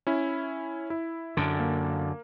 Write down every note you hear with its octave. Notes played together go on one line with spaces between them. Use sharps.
C#4 E4
E4
F#2 D3
A#3